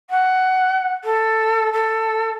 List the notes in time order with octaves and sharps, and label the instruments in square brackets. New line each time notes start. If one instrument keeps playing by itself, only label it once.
[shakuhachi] F#5
A4
A4